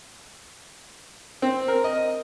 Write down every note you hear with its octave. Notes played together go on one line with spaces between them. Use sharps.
C4
A#4
D#5